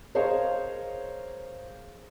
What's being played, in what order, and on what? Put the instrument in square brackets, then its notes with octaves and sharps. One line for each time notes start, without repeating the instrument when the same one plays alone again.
[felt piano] G#4 A#4 C5 C#5 D#5 F5